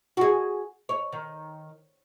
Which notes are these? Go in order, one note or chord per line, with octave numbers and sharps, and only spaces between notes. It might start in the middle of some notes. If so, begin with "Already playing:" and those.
F#4 G#4
C#5
D#3